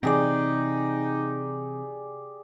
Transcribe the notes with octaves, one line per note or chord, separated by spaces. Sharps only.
C3 E3 C4 D#4 G4 G#4 D5